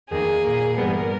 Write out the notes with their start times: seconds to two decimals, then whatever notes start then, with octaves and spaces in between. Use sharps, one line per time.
0.10 E2 D#3 A#3 G#4
0.44 A#2 A#3
0.77 G2 E3 G3 B3 A#4